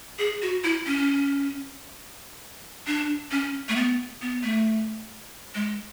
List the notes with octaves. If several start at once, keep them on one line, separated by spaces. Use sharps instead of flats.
G#4
F#4
E4
C#4
D4
C#4
A3
B3
B3
A3
G#3